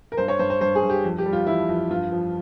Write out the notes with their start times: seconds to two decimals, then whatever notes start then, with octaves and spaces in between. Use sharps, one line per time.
0.12 A#4
0.17 G2 C5
0.28 C#5
0.39 G2 C5
0.50 C5
0.61 G2 C5
0.75 G#4
0.83 G2
0.90 G4
1.04 F2
1.18 G4
1.26 G3
1.33 F4
1.47 E3 E4
1.69 F2
1.90 G2 F4
2.12 F3